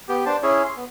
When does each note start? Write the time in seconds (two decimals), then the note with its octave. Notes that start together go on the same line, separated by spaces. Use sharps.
0.09 B3 G4
0.26 D4 C5 A5
0.43 C#4 E4 G#4 C#5
0.65 C6
0.76 B3